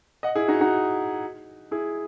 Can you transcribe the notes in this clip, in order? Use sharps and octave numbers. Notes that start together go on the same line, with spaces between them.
D#5 F#5
E4 G#4
D#4 F#4
D#4 F#4
E4 G#4